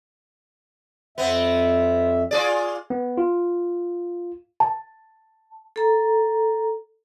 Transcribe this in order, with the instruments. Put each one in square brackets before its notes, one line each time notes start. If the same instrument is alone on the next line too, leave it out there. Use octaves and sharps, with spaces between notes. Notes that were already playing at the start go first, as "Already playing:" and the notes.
[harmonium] F2 E5 [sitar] B3 C4
[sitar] F4 G#4 D5
[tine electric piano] B3
F4
[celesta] A5
[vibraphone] A4 A#5